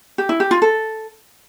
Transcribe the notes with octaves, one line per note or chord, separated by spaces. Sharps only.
G4
E4
G4
F4
A4